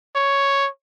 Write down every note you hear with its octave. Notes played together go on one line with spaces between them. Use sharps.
C#5